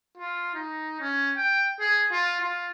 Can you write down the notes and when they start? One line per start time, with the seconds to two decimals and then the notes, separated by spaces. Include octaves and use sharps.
0.17 F4
0.55 D#4
1.00 C#4
1.37 G5
1.80 G#4
2.11 F4
2.41 F4